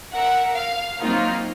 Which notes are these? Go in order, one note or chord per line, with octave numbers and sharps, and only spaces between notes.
A#4 E5 F#5
F5
F#3 A#3 C4 D#4 F4